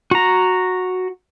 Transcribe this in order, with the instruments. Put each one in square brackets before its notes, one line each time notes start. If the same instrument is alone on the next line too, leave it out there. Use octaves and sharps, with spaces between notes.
[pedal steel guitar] F#4 A#5